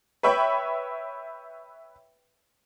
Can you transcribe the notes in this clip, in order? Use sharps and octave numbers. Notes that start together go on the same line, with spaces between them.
B4 C#5 E5 G5 B5 C#6